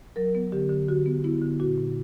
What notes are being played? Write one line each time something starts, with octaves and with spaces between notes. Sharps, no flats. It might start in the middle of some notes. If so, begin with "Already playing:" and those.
F#3 A#4
B3
D3 G4
D3
D3 F#4
B3
B3 E4
D3
A#2 F#4
A#2